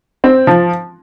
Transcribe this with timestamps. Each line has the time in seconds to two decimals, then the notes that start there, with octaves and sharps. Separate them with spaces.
0.24 C4
0.47 F3